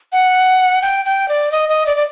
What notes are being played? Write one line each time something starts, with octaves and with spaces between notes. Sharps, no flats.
F#5
G5
G5
D5
D#5
D#5
D5
D5